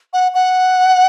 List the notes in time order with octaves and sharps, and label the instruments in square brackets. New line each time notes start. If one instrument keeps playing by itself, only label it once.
[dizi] F#5
F#5